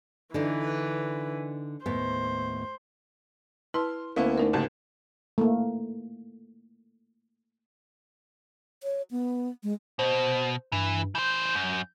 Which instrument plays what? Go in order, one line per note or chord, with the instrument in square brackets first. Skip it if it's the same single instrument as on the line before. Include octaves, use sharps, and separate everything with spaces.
[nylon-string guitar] D3 D4 D#4 [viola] E3 B4
[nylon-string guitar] D#2 A2 B3 [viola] C5
[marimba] E4 B4 A5 [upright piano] C6 [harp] F6
[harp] D2 C#4 [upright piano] A#3 B3 E4 [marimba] F5
[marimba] A3 D#4 A#4 [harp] D4
[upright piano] G#1 D#2 A5 [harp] C#3
[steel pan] A3 A#3
[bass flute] C#5
B3
G#3
[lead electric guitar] B2 [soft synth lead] C5
[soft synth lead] G2 [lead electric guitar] E3
[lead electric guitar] E3 C5 [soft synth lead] G6
[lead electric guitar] F#2